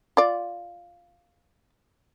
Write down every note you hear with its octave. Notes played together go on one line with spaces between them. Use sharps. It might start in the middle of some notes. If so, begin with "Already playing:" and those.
F4 D5